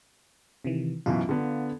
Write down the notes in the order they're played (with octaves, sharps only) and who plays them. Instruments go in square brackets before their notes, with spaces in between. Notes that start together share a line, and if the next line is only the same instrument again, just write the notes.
[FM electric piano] C3 D#3 E3
[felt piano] F#2 B2 E3 [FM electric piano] F4
[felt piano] D3 B3